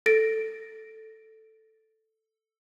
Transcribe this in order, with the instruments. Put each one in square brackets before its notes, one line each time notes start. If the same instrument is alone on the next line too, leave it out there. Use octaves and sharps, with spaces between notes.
[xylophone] A4 A6 A#6 D7